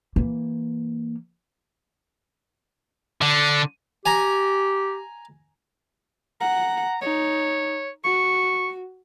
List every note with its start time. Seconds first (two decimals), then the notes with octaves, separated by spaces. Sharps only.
0.16 E3 A#3
3.21 D3
4.06 G4 G#5 A#5
6.41 F#5 A#5
7.01 D#4 C#5
8.04 F#4 C#6